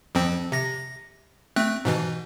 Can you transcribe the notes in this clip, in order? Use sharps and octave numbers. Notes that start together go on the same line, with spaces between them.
F2 F3 C4
C3 A#6
A3 C4 F#6
G#2 B2 E3